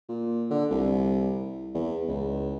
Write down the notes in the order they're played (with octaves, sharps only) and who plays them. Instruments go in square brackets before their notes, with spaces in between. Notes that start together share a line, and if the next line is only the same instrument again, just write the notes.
[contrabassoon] A#2
D3
C2
E2
C#2